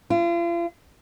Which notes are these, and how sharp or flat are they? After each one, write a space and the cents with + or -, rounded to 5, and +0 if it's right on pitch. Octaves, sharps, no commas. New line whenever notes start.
F4 -40